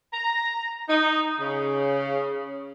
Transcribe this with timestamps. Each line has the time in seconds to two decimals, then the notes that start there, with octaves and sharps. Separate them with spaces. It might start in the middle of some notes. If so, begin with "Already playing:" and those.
0.13 A#5
0.89 D#4
1.40 C#3